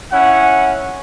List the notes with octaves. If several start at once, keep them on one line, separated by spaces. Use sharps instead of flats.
C#4 E4 F#5